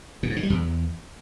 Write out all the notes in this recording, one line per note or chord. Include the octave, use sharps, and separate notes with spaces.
A#2
G#2
C#3
G3
E2